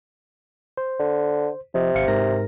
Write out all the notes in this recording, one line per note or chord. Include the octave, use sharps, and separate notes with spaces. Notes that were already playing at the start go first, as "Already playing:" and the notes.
C5
D3
C3 F3 D#5
G#1 F5 C#7
G#2 A#4 A#6